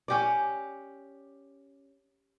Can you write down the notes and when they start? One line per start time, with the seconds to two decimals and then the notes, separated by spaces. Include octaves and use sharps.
0.08 C#4 G4 D5